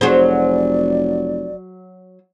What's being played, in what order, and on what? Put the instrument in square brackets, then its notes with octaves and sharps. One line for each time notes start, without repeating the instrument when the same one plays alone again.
[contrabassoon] F1 [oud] F#3 G#4 C5 [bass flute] D5